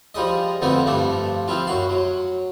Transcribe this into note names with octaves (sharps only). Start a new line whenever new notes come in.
F3 G3 G#3 D#5
F2 D3 F3 A3 B3 C4
G2 F3 A3 D4
F3 C4 E4 F4
F#2 F#4 C6
F#3